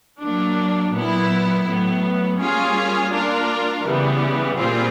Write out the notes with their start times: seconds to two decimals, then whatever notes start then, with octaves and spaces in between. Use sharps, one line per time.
0.22 F#3 A#3 D4
0.94 A#2 F#3 B3 E4
1.67 A2 F#3 B3
2.40 G3 A#3 C#4 F4 G#4
3.12 A#3 D4 F4 A#4
3.85 C#3 E3 G3 B3
4.57 A#2 G3 C4 F4 G#4